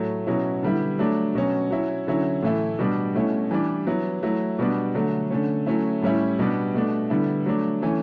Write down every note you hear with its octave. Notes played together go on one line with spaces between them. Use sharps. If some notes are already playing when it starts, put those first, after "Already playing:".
Already playing: A2 F#3 A3
B2 F#3 C#4 E4
D3 G3 B3 E4
F#3 A3 D4
B2 F#3 C#4
F#3 C#4 E4
D3 F#3 C#4 E4
A2 E3 A3 E4
B2 G3 D4
B2 A3 C#4 E4
E3 G3 D4
F#3 B3 E4
F#3 A3 E4
B2 G3 B3 D4
D3 F#3 A3
D3 A3 C#4
F#3 A3 C#4 E4
A2 G3 C#4 E4
B2 G3 B3 D4
B2 A3 D4
D3 G3 B3 E4
F#3 A3 D4
E3 A3 C#4